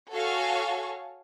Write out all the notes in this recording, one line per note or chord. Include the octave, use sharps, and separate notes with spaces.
F#4 A4 C#5 F5 G#5 C#6